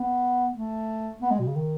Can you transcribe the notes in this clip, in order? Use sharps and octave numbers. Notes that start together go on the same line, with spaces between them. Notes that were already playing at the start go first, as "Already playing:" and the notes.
Already playing: B3
A3
B3
G#3
B2
C#3
D#3